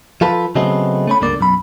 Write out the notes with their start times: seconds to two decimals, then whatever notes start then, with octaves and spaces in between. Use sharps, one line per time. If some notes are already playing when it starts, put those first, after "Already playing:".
0.21 F3 F4 A4 B4
0.55 C#3 F#3 G#3 A3 B3 C4
1.07 A3 C#4 B5
1.21 C#2 G2 D3 A#3 D5
1.39 B1 F#2 B5